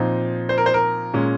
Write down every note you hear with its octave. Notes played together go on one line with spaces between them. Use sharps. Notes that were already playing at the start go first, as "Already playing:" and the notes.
Already playing: A#2 F3 C4 D#4
C5
A#4
C5
A#4
A#2 G#3 C#4